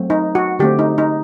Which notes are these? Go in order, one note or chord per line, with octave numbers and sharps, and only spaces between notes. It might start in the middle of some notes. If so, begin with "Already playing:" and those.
Already playing: F#3 A3 C4
D#4
F#4
D3 A3 C4 G4
D#4
D#4